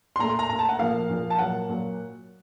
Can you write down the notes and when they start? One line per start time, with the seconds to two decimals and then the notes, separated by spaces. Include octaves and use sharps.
0.16 C6
0.19 A#2 A3 A#5
0.30 C6
0.39 A#5
0.50 A#2 A3 A#5
0.59 A5
0.69 F#5
0.79 A#2 F3 A#3 F5
1.09 A#2 F3 A#3
1.30 A5
1.38 A#2 F#3 A#3 F#5
1.69 A#2 F#3 A#3